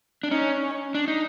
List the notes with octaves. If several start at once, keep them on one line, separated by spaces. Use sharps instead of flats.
D4
C#4 D#4
C#4
D4
D#4